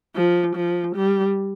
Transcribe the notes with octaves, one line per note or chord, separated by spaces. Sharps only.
F3
F3
G3